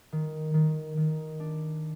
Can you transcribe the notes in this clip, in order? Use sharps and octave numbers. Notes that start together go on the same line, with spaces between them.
D#3
D#3
D#3
D4